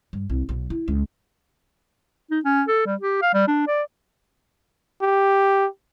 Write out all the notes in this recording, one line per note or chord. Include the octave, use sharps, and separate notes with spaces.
G2
C2
B1
E4
C#2
D#4
C#4
A4
G3
G4
F5
G3
D4
D5
G4